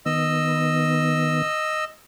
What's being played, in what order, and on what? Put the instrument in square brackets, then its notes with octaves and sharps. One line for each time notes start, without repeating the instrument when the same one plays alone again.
[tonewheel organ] D#3 B3 [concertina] D#5 E6